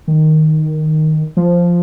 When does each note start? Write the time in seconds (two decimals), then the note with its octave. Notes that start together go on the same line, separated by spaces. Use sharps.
0.08 D#3
1.37 F3